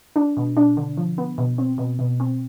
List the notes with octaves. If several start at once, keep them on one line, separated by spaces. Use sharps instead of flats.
D4
B2
D4
D3
F3
B3
B2
C4
B2
B2
C4